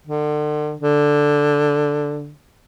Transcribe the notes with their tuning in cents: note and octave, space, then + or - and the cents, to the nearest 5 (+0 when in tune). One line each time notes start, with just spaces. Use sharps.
D3 +35
D3 +0